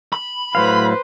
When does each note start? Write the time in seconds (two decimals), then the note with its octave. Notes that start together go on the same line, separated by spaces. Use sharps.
0.13 B5
0.55 A2 F#3 B4 C5 F5